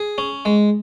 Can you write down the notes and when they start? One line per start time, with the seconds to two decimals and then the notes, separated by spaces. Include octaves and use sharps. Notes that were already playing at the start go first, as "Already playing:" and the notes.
Already playing: G#4
0.18 C#4
0.45 G#3